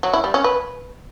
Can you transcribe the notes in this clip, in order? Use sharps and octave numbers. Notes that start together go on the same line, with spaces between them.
F#3
E4
G3
C#4
B4